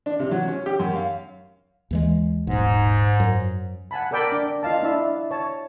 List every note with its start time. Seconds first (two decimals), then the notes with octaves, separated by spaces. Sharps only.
0.06 D4
0.19 C3
0.31 F#3
0.48 C#4
0.66 G4
0.79 F#2
0.95 F5
1.91 D#2 E3 G#3
2.47 D#1 B1 G#2
3.20 F#2
3.91 F#5 G#5 A5 B5
4.11 A4 A#4 D5 G5 A5 B5
4.28 D4 D6
4.63 F4 D#5 F5 A5
4.83 D4 E4 E5 A5
5.31 C#5 A5